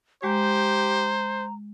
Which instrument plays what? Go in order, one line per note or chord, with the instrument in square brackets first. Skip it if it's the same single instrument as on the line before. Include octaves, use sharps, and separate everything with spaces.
[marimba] G#3 [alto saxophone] G4 [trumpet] C5 [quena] A#5